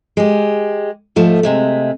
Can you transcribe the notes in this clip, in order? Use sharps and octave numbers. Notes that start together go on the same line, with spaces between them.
G#3 G4
G#2 F3 A3
C3 G#3 A3